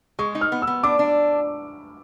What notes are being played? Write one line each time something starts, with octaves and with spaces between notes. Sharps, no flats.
G#3 C#6
D#4
F6
B3
E6
B3
D4 D6
D4